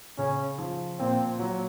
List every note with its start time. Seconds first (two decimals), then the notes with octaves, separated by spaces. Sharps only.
0.18 C#3 C#4
0.58 F3
0.99 A#2 C4
1.39 F#3